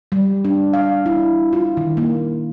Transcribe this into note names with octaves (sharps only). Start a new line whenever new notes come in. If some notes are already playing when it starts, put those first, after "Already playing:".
G3
D4
F5
E4
F4
D#3
A#3